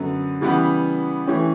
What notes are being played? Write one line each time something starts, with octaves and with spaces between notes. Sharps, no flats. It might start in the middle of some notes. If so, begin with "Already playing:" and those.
Already playing: F#2 D3 F#3 B3
C#3 E3 G3 B3
E3 A3 C#4 G4